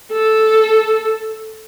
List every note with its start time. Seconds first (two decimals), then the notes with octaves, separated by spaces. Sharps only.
0.12 A4